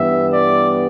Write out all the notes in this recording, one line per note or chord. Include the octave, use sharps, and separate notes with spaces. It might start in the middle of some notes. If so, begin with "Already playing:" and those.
Already playing: G2 E3 G3 B3 E5
D5